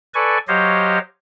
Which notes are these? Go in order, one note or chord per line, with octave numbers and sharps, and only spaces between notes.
A4 B4 D5 G#5 C#6
F#3 G4 C5 C#5 D#5 F5